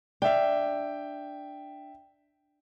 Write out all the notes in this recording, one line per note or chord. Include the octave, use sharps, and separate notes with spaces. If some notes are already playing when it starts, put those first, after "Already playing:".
D4 E5 F5 G5